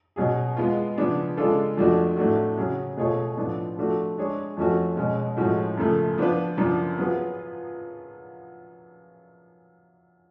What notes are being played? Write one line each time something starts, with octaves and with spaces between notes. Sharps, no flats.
B2 F#3 C#4 G#4
G#3 B3 F4
C#3 F3 B3 D4 G#4
C#3 G#3 D4 F4 A4
F2 F3 A3 D4 F#4
A2 F#3 A3 D4 F#4
C#3 F#3 C#4 G#4
B2 A3 F4 G#4 C#5
A2 F3 B3 D4 F4
F3 A3 D4 F#4
G#3 D4 G#4 C#5
F2 F3 A3 C#4 F#4
B2 G#3 C#4
A2 F3 G#3 C#4 F#4
F#2 C#3 F3 A3
F3 B3 D4 F4 B4
F#2 C#3 F3 B3 D4
F#3 B3 F4 G#4 B4